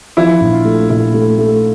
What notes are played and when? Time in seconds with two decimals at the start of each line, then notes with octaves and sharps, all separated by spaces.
0.17 F3 E4
0.41 A#1
0.53 F4
0.65 A3
0.90 A#2 E4
1.14 A3
1.38 A3